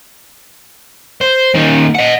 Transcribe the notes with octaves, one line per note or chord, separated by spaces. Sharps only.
C5
A#2 D#3
D#5 F#5